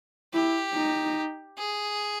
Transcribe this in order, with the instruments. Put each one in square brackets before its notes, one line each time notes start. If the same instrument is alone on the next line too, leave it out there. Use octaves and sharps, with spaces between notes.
[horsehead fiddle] E4 [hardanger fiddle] G4
[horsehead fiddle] D#4
[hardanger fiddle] G#4